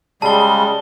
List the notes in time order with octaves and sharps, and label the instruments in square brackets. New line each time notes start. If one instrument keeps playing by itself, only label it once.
[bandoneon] C#3 G3 G#3 [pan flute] G#4 [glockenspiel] A5 G7